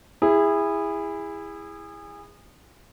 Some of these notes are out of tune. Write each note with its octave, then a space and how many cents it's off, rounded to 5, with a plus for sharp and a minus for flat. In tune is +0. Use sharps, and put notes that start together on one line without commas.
E4 +0 G#4 -25